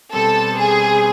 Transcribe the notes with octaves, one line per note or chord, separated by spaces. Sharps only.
B2 G3 C4 A4
G#4